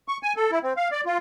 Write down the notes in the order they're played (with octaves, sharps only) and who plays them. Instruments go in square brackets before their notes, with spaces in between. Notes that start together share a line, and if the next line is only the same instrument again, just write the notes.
[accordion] C#6
G#5
A4
E4
C4
F5
D5
F4